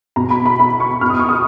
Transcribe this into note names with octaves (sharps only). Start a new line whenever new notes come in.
B2 A#5
B5
B5
B5
C#6
B2 F6
D#6
C#6
D#6